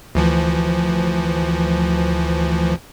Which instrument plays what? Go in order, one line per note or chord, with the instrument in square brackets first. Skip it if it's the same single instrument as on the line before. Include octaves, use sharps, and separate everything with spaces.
[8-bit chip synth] D2 E3 F3